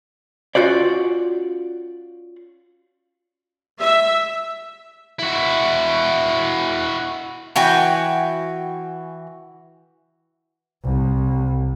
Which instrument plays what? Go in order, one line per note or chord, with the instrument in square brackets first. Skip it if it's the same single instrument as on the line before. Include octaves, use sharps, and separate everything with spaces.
[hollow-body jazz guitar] C#4 F4 F#4 C5 D5
[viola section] E5
[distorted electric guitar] E4 F#4
[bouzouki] E3 F#4 G5 G#5
[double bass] C2